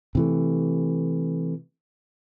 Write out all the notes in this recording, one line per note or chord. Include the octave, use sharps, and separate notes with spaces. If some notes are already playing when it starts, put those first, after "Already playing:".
C3 E3 A3